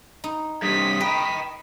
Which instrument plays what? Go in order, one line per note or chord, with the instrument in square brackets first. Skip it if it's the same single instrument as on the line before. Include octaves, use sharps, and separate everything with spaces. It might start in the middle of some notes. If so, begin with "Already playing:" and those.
[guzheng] D#4
[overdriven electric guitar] G2 C3 [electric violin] D#6 B6
[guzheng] B4 D#5 [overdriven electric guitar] G5 A#5